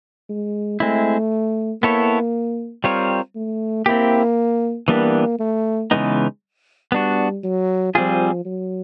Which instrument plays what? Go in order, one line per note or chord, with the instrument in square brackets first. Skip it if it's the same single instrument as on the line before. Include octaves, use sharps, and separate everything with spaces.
[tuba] G#3
[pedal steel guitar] G#3 C4 E4 [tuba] A3
[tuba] A#3 [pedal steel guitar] B3 E4 A4 C#5
[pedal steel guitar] G3 C4 F4 A#4 C#5
[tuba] A3
[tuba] A#3 [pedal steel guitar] C4 E4 G4
[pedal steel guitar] E3 G3 B3 D4 G4 [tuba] A#3
[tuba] A3
[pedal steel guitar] C#3 E3 G#3 B3 D#4
[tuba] G3 [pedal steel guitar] B3 D4 F#4
[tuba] F#3
[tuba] F3 [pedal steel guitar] G3 C4 F4 G#4
[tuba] F#3